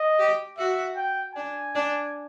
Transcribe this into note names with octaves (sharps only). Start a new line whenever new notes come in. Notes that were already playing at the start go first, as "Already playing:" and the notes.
Already playing: D#5
G4
F#4 E5
G5
D4 G#5
D4